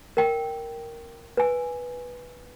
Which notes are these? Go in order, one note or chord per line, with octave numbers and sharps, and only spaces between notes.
A#4 G5
B4 G#5